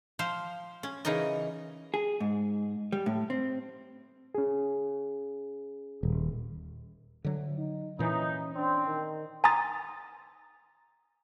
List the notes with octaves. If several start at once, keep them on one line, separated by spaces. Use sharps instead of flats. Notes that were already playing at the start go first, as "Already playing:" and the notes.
F3 C5 F5
C#4
C#3 E3 D#4 A#4 D#5
G#4
G#2
G3
A2
C4
C#4 G#4
D#1
D2 D3 F#3
D#4
A#2 E3 C#4 D#4
C4 D4
D#3
G#5 A#5 C6 D#6 A6